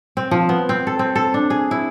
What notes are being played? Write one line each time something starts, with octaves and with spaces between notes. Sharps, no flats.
C4
F3
B3
C4
A4
C4
A4
D4
G#4
E4